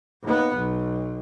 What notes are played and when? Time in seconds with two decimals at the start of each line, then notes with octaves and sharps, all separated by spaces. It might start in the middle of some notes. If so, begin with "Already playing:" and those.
0.23 D#2 B3
0.55 B1